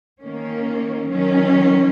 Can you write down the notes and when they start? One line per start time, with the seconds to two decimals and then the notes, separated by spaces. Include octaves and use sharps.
0.22 D#3 A#3 C#4
1.10 D#3 F#3 C#4